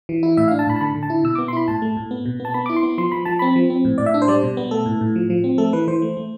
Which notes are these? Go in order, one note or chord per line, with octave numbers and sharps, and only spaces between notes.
E3
E4
A2 E5
F5
D4
A5
A2 B5
A5
D3 B5
D3
A5
E4
B2 E6
D6
B3
C6
E4 B5
A2 A5
A3
A2
B3
B2
B3
A5
B3 B5
E4 D6
C6
B3
F3 C6
F3 B5
F3 A5
C4 B5
F3
C4
A2
A2 D5
E5
D4
C5
G3 D5
B2
B3
A3 A4
A2
A2
F3
F3
C4
A3 A4
E3 B4
E3 C5
A3
A3